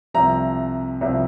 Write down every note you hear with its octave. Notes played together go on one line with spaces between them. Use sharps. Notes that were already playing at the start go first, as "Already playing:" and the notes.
C2 C3 F3 A#5
C2 C3 F3